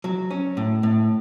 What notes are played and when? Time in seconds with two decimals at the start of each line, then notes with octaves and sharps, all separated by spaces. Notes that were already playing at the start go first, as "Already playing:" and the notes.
0.04 F#3
0.31 C#4
0.57 A2
0.83 A2